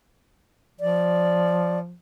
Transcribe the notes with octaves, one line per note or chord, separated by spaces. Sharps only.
F3 D5